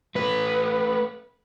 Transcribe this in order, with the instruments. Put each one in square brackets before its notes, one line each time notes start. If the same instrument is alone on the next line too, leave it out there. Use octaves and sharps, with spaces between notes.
[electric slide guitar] A3 B4